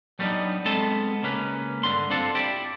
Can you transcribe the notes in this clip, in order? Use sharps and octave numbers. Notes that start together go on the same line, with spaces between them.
F#3 G3 A3 B3 D4 D#4
G#3 B3 C4 A4 A5
C#2 A#3 C#4 B4
G2 D3 C6
C4 D4 F4 A4
E4 G4 D5